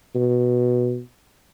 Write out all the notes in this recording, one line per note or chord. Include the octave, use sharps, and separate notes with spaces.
B2